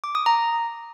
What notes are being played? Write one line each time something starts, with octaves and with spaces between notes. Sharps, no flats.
D6
D#6
A#5